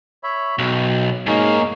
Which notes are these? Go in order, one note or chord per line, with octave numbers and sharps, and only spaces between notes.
C#5 E5 B5
B1 B2 G5
F2 G#2 A#3 C#4 D#4